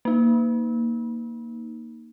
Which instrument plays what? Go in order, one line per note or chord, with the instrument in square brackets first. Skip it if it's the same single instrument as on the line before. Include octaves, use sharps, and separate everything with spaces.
[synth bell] A#3 D#4